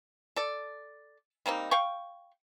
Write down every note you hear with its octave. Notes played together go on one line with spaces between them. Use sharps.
A4 D5
G3 A#3 C4 D#4
F5 G5 C#6